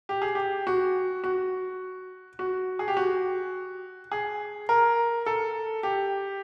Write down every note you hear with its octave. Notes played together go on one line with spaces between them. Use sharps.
G4
G#4
G4
F#4
F#4
F#4
G#4
G4
F#4
G#4
A#4
A4
G4